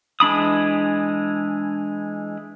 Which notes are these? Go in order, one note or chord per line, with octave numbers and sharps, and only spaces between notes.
E3 G#3 D4 B5 D#6